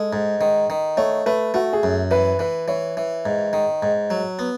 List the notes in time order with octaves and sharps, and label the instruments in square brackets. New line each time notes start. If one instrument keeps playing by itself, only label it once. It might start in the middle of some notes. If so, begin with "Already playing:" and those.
Already playing: [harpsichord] G#3 [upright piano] A4
[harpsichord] G#2
D#3
D#3
[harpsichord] A3 [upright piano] C#5
[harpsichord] A3 [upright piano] B4
[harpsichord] A3 [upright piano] F#4
[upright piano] G#4
[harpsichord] F#2
[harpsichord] E3 [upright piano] B4
[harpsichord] E3 [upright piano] B4
[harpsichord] E3 [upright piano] C#5
[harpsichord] E3
G#2
D#3
G#2
F#3
B3